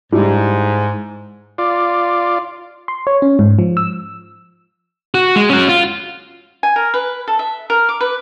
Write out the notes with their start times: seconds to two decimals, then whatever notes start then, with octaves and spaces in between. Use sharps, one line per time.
0.12 G#2 G3 D4 E4
1.58 F4 D5
2.88 C6
3.07 C#5
3.22 C#4
3.39 G#2
3.59 F3
3.77 E6
5.15 F#4
5.36 G#3
5.49 C#4 F#4
5.69 F4
6.63 G#5
6.76 A#4
6.94 B4
7.27 A4
7.39 E5
7.70 A#4
7.89 D6
8.01 B4